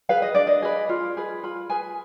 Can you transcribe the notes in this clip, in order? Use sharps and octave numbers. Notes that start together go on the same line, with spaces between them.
G#4 B4 F5
D#5
D4 D5
D#5
G#4 B4
F4
G#4 B4
F4 B5
G#4 B4 G#5